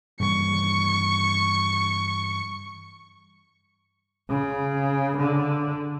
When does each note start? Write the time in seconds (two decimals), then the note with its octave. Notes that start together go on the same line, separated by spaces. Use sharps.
0.20 G2 C#3 E3 C#6
4.29 C#3
5.17 D3